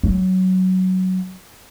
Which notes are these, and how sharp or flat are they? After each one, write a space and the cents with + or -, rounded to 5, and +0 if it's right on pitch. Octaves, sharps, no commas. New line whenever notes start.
F#3 +10